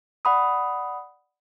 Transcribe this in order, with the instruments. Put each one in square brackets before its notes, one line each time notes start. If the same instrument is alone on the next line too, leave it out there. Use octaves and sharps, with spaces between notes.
[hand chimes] D5 F#5 B5 D#6